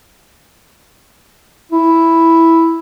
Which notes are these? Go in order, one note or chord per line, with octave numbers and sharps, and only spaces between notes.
E4